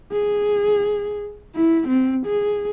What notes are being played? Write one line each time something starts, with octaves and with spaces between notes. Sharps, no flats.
G#4
E4
C4
G#4